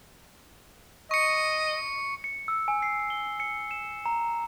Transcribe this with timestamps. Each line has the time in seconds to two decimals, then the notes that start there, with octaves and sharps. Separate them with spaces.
1.11 D#5 C#6 C#7
2.24 C#7
2.48 E6
2.68 G#5
2.82 C7
3.10 G7
3.40 C#7
3.71 E7
4.06 A#5